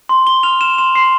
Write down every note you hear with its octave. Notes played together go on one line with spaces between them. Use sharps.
C6
C6 G7
F6 F7
F6 E7
C6 E7
C6 C7